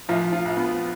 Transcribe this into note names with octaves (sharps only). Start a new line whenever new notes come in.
A#1 F3 F4
F3 F4
A#1
B3 B4